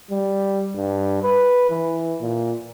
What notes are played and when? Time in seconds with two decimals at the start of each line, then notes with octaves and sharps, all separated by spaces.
0.11 G3
0.75 G2
1.23 B4
1.70 E3
2.21 A#2